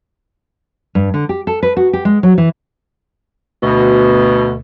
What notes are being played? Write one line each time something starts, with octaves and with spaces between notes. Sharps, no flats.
G2
D3
G4
A4
B4
F#4
G4
G#3
F#3
E3
D2 B2